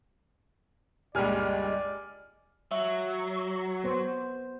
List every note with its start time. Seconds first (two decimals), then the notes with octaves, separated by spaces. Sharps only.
1.15 C#2 G2 A#2 G3 G#3 D5 G#5 F6
2.71 F#3 E5
3.84 B3 C5